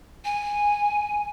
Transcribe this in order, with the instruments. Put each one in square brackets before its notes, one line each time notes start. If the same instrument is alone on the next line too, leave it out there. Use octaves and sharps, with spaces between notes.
[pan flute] G#5